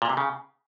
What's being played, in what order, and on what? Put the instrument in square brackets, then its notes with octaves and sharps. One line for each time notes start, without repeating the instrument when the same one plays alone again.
[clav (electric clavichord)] A#2
C3
C#3